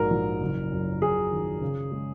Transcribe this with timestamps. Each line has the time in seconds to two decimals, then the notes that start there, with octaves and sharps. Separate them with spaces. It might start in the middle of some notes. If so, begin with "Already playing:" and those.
Already playing: A#1 G#2 F#3 A#4
0.11 A#1
0.41 F#1
0.72 F#2
1.02 F#1 G#4
1.32 D#3
1.61 C#3
1.91 G#3